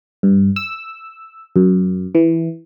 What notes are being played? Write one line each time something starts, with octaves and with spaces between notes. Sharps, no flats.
G2
E6
F#2
E3